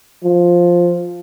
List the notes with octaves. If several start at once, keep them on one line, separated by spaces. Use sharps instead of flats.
F3